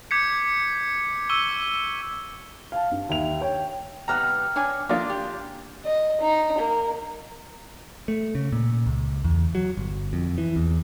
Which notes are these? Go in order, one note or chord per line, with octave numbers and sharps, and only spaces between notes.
D6 G6 G#6 B6 C#7
C#6 E6 D#7 G7
F5 A5
G2
D#2 E5 F7
C#5 G5
C3 G3 B3 G5 A#5 F6 F#6
D4 C#5 G#5
F3 A#3 D4 F4 C6
G4
D#5
D#4
A#3
A3
C#3
A#2
C#2
E2
F#3
G1
F2
E3
E2